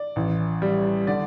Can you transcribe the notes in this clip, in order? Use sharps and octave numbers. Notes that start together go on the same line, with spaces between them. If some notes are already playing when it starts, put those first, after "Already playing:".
Already playing: D5
A1
G3
D3 D5